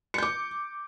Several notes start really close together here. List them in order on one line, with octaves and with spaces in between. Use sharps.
C#7 G6 D6